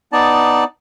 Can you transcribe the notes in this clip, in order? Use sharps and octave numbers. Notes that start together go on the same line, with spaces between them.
B3 D#4 D5 A5